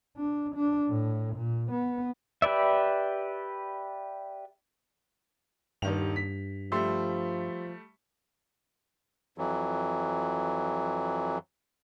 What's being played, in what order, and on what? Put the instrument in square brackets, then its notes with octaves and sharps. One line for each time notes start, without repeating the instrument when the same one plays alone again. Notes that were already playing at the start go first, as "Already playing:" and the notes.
[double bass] D4
D4
A2
A#2
B3
[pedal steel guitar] G4 B4 D5 E5
[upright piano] D#1 D#3 F7 [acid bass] G2
[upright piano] B6
[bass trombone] F3 [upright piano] G3 A3 [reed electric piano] G4 C6 E6
[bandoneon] F2 E3 F#3